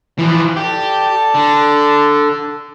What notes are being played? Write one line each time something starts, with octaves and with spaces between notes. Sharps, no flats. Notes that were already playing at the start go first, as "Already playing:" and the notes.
E3 F3
G4 A4 D5 A5
D3